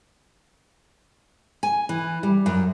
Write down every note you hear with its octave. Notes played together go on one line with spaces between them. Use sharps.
G#5
E3
G3
F#2